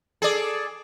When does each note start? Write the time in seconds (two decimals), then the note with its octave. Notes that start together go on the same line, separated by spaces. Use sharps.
0.22 G#4 A4 D5